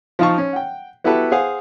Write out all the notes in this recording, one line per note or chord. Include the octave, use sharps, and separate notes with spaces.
F3 D#4 F4 F5 A5 C#6
C#4
F#5 G5
B3 E4 F#4 G4 A4 B4
G#4 C5 F5 F#5 G#5